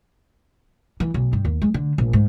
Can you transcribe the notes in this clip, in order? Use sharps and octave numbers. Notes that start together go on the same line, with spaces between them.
E3
B1
G2
D#2
G#3
D3
A#1
G#2